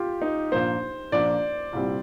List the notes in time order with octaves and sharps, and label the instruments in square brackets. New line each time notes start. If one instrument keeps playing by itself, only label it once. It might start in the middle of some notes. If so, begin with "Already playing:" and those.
Already playing: [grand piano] F4 G4
D#4
[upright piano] A#1 A#2 F3 A#3 [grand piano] C5
[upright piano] A#1 A#2 F3 A#3 [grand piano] D5
[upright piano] C2 A#2 G3 C4